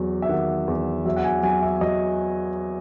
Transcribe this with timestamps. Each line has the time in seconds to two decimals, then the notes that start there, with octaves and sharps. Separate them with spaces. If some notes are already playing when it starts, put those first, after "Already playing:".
Already playing: E2 F#3
0.22 E5
0.29 D#3 F#5
0.68 E2
1.05 F#3 E5
1.16 F#5
1.24 G#5
1.43 F#3 G#5
1.63 E5
1.81 F#3 D#5